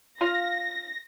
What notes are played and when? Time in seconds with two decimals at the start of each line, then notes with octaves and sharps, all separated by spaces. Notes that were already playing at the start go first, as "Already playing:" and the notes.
0.21 F4 F5 A#6